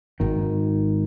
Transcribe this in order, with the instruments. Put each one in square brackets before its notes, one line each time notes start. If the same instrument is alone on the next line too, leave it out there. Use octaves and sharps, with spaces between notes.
[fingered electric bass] G#1 D#3